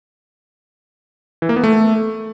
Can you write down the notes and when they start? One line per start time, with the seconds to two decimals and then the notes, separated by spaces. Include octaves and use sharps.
1.42 E3
1.49 A#3
1.56 B3
1.63 A3